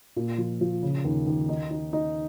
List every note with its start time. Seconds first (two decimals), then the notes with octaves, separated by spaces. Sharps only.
0.16 A#2
0.38 F3
0.61 F3
0.82 C#3
1.04 D#2
1.27 D#2
1.49 D#4
1.70 D#4
1.93 D#4